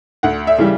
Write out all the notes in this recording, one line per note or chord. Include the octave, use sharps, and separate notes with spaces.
D2 F#5
E5
C#3 E3 G3